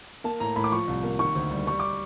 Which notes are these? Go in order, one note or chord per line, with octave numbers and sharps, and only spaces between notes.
A#3 A5
A2 A#5
A2 B5
D6
F3 C#6
C2
A#3
D#3 C#6
D2
G3
G3 C#6
D6